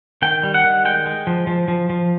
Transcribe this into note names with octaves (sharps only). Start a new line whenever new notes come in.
D#3 G5
G3
F#5
D#3
G#3 G5
G#3
F3
F3
F3
F3